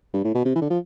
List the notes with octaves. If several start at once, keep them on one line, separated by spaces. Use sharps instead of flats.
G2
A2
B2
C3
E3
D3
F3